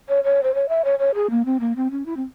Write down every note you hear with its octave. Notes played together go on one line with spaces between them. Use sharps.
C#5
C#5
C5
C#5
E5
C#5
C#5
G#4
A#3
C4
A#3
C4
C#4
E4
C4